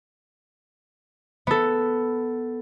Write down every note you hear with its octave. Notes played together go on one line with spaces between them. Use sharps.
B3 A4